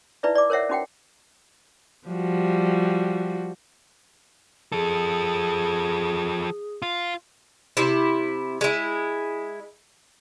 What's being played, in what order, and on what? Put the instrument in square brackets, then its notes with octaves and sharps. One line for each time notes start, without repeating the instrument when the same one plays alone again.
[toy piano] D#4 E4 B4 D5 E5
D5 D6
A#4 C5 C#5 E5 F#5
C#4 D#4 F#4 F#5 G5
[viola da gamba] F3 G3 F#4
[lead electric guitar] F3 A4 [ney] G#4
[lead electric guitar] F4
[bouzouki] C3 E4
G#3 E4